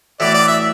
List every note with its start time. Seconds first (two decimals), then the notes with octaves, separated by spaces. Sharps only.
0.20 A2 E3 B3 F#4 D5
0.34 D5
0.47 E5